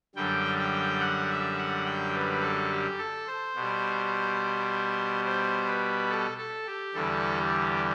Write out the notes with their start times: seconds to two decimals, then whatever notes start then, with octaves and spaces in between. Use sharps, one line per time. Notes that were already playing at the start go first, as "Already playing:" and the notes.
0.15 F#2 D3 G3 G5
0.58 G5
1.00 F#5
1.30 E5
1.58 F#5
1.85 G5
2.14 B4
2.41 A4
2.71 G4
2.98 A4
3.27 C5
3.55 B2 G3
5.25 C5
5.68 B4
6.09 A4
6.37 A4
6.66 G4
6.94 E2 D3 G3 A4
7.37 G4